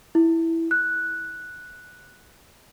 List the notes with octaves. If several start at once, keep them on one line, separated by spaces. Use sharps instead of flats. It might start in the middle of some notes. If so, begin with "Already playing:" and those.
E4
F#6